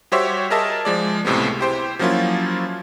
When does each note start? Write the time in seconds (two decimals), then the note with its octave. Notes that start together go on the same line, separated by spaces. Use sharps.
0.12 G3 F#4 G4 C5 C#5 E5
0.50 G#4 A#4 D#5 E5 A5
0.85 F3 G#3 D5
1.25 C#2 A2 C3 G#3 B3
1.59 E4 G4 C5 G5
1.99 F3 F#3 A#3 C#4 E4 F4